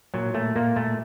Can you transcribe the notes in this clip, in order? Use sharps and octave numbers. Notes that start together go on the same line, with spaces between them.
A#2 F#3
A#2 A3
A#2 A#3
A#2 A3